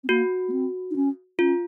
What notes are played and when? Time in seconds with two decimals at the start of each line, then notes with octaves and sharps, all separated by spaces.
0.04 C4
0.09 A#3 F#4
0.48 A#3
0.52 C4
0.91 D#4
0.96 C#4
1.39 C#4 F4